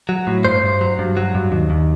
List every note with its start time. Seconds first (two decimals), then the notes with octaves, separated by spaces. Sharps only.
0.09 F#3
0.27 A2
0.45 G2 C5
0.64 G2
0.81 F#3
0.99 G2
1.17 F#3
1.35 G2
1.52 D#2
1.70 D#2